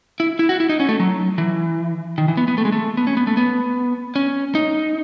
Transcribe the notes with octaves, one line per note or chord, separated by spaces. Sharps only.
E4
E4
F#4
E4
D#4
C#4
A3
F#3
E3
D#3
E3
B3
B3
A3
G#3
A3
B3
C#4
B3
A3
B3
C#4
D#4